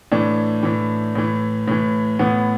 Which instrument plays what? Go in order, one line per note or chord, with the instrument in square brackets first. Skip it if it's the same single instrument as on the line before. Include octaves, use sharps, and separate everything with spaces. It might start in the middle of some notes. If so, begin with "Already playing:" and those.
[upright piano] A2 E3 D4
A2 E3
A2 E3
A2 E3
A2 E3 B3